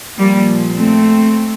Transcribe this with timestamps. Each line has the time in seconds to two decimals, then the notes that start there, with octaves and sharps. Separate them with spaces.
0.18 A#2 F3 G3 A#3
0.75 A3 C4